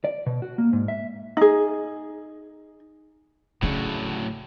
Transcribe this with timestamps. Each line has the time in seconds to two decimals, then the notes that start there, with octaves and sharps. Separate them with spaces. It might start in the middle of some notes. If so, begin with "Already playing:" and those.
0.04 D5
0.26 B2
0.42 F#4
0.58 A#3
0.73 G#2
0.88 E5
1.37 D#4 G#4
3.62 A2 C#3 F#3 A3 C#4 D5